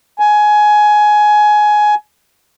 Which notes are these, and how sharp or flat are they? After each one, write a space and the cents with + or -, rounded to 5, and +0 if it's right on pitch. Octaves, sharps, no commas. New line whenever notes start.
G#5 +15